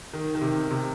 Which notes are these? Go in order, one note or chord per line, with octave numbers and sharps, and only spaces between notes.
D#3
D#3
C3
C3